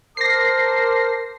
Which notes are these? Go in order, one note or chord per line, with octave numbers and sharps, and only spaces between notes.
A#4 C5 A5 D6 A#6 C7